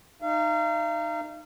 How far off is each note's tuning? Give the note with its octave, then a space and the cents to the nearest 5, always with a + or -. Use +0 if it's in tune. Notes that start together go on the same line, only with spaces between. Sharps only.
D#4 -20 F5 -35